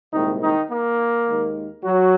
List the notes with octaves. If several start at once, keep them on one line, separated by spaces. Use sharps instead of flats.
C2 A#2 D#3 G#3 D#4
D#3 D#4
A#3
D#2 D#3 G#3
F#3 F#4